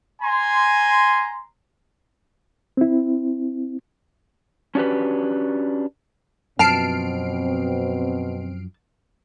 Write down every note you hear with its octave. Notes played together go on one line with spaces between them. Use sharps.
G#5 A#5 C6
C4 E4
C#4 D4 F#4 G4 B4
F#2 B2 F3 C4 A5 F6 C7 D7